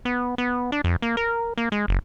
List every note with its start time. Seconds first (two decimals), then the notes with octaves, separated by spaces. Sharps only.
0.05 B3
0.38 B3
0.72 D4
0.84 F2
1.02 A#3
1.17 A#4
1.58 A#3
1.72 G#3
1.88 F#1